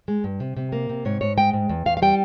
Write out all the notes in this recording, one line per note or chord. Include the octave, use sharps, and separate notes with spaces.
G#3
G2
C3
C3
A#3
C3
G#2 C#5
G#2 C#5
G#3 G5
G#2
E2
E2 F5
F5
G3 G5